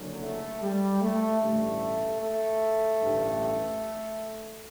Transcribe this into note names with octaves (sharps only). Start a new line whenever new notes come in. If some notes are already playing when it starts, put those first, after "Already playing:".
Already playing: F#1 F#2 D3 F#3
A3
G3
A3
A1 G2 D3 G3 A3
A3
A1 G2 D3 G3